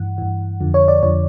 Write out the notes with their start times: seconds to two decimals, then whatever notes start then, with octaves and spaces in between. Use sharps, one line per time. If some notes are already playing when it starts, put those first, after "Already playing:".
Already playing: G2 E3 F#5
0.18 G2 E3
0.60 F2 D3 F3
0.74 C#5
0.88 D5
1.02 F2 D3 F3 C#5